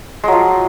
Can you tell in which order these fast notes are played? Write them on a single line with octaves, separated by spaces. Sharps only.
G#3 F#3 F3